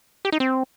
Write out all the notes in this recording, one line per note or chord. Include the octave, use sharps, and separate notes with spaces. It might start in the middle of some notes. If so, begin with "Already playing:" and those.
G4
D#4
C4